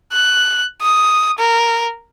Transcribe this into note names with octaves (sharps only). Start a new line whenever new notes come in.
F#6
D#6
A#4